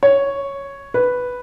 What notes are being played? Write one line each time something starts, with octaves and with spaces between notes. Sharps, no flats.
C#5
B4